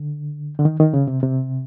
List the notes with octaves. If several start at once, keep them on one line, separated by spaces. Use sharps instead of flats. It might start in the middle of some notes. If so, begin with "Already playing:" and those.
Already playing: D3
D3
D#3
D#3
C#3
C3
C3